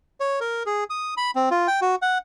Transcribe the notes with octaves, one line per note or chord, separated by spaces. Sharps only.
C#5
A#4
G#4
D#6
B5
C4
F4
G5
F#4
F#5